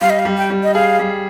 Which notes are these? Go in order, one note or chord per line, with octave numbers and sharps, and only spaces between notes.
G3 F5
D#5
F5
G3
G5
G3
D#5
G#4 F5
G3